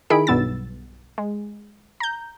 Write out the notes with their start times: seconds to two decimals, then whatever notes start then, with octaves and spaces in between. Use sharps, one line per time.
0.10 D#3 E4 G#4 B5 D7
0.27 B1 G2 B3 E6 A6
1.18 G#3
2.00 A#5 G6